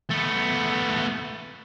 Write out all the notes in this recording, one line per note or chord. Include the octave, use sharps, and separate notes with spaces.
A3 B3